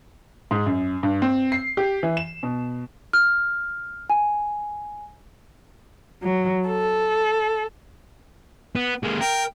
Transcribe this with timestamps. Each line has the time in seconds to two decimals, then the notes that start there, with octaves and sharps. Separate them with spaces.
0.51 G#2
0.66 F#2
1.03 G2
1.22 C4
1.52 C7
1.77 G4
2.03 E3
2.17 E7
2.43 B2
3.13 F6
4.10 G#5
6.22 F#3
6.66 A4
8.76 B3
9.03 G#3 A#3
9.21 A#4 G5